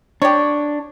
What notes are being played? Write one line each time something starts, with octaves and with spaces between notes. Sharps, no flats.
D4 G4 C#5